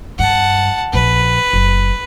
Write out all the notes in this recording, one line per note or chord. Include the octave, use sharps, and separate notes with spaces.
G2 F#5 A5
A#1 B4
F#1